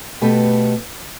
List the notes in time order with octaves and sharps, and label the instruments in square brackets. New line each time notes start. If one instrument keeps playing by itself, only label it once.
[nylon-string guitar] B2 A3 G4 B4